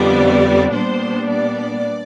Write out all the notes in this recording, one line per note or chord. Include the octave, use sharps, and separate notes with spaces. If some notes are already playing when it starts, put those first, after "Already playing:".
Already playing: F2 D3 G3 B3 D5
A#2 G3 B3 D4 C5
D5